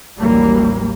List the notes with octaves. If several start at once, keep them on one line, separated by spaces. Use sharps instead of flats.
A1 D#2 E3 F#3 G3 A#3